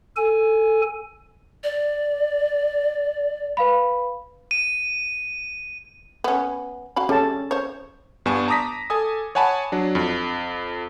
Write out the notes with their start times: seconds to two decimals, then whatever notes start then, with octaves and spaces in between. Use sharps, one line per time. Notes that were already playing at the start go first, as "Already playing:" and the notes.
0.16 A4 G#5
1.64 D5
3.57 B4 F5 B5
4.51 D#7
6.24 B3 C#4
6.96 F#4 F5 B5
7.09 G3 C#4 A4 A5
7.51 C5 C#5
8.26 G2 B3 D4 G#5 C#6 E7
8.48 A5 A#5 D6 D#6 A#6 B6
8.90 A4 G#5 D#6
9.35 C#5 F#5 G#5 A5 B5
9.72 F#3 D4
9.95 F2